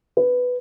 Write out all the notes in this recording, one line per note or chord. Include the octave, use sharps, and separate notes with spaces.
B4